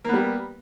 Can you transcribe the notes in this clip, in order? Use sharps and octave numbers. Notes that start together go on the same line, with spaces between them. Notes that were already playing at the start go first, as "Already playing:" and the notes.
G3 A#3 B3